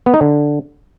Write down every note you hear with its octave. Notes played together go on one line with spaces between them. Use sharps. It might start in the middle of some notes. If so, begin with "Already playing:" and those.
B3
D#4
D3